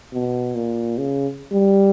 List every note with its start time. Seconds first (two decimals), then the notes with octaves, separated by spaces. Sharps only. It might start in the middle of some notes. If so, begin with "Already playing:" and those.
0.14 B2
0.55 A#2
0.98 C#3
1.54 G3